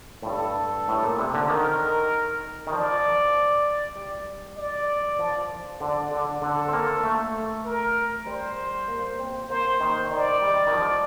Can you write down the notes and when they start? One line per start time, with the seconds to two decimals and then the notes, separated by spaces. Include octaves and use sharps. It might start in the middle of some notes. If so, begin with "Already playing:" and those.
0.22 A2
0.26 G2 A4
0.88 A2
1.03 A#2
1.19 C3
1.34 D3
1.50 D#3 A#4
2.67 D#3
2.72 F3 D5
3.96 G3
4.57 D5
5.19 F3
5.80 D3 D5
6.11 D3
6.42 D3 A4
6.68 C4
6.73 A#3
7.04 A3
7.65 A#4
8.26 G3 C5
8.88 A#3
9.19 C4
9.50 A#3 C5
9.80 D#3
10.11 D#3 D5
10.42 G3
10.67 D#3
10.73 F3